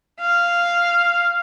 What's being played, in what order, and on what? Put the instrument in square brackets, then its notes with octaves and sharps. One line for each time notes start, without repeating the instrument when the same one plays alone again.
[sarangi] F5